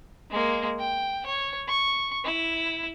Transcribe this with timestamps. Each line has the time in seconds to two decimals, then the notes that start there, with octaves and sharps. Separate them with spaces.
0.30 G#3 A#3
0.79 G5
1.26 C#5
1.67 C#6
2.24 E4